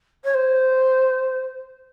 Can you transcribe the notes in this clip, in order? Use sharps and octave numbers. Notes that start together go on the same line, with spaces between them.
C#5
C5